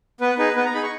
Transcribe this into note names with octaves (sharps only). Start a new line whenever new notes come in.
B3 B4
D#4 G#4 B4
B3 B4
A#5
D#4 G#4 B5
C#6